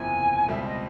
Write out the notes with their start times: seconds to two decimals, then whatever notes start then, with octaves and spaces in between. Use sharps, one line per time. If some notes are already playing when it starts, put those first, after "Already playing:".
Already playing: F#1 E2 C3 F3 G#5
0.48 C#2 B2 G3 C4 E5
0.61 E5
0.66 D#5